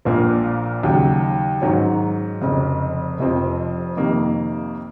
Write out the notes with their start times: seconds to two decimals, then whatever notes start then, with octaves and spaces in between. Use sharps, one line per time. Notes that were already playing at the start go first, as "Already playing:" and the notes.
0.05 A#1 A#2 F3 A#3
0.83 D#2 C#3 F#3
1.62 G#2 D#3 F#3 C#4
2.41 F1 F2 C#3
3.19 F1 F2 C3 F3 C4
3.97 F2 C3 D#3 A#3